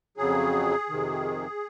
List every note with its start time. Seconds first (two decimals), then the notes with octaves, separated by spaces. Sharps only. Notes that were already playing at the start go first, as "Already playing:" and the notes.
0.17 F2 C#3 F#3 G#4
0.89 F2 C3 D#3